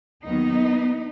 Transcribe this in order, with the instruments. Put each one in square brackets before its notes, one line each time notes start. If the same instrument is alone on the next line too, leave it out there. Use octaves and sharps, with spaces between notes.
[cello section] D#2 D#3 F#3 B3 D#4